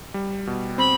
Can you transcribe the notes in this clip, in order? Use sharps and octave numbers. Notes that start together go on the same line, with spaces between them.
G3
B2
C4 B5